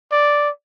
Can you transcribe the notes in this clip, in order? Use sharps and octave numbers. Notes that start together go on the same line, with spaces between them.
D5